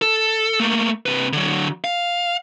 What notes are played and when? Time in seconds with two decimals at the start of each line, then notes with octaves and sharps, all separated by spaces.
0.02 A4
0.60 A3 A#3
1.06 C3 B4
1.33 D3 F#3
1.84 F5